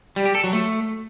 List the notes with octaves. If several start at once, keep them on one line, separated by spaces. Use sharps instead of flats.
G3
G4
A4
F#3
A3